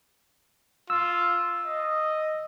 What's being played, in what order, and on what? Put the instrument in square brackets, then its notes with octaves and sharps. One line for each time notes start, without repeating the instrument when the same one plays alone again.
[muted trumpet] F4 [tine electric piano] E6
[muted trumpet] D#5